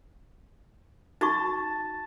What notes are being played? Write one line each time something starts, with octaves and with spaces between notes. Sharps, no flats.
D#4 F#4 A5 C#6